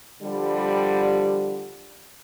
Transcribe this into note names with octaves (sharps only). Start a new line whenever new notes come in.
D3 F3 G3